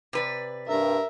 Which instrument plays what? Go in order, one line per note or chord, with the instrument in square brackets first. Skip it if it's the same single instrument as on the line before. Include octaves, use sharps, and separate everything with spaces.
[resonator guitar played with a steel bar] C3 B4 D5
[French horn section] G2 [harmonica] A#4 [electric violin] E5